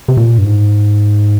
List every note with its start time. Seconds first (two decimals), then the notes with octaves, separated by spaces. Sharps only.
0.08 C3
0.17 A#2
0.38 G2
0.45 G#2